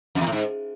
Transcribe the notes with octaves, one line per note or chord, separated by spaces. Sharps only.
F2
E2
A2
G#2